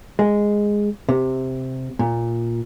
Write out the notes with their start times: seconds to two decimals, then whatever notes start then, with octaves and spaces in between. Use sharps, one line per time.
0.19 G#3
1.09 C3
1.99 A#2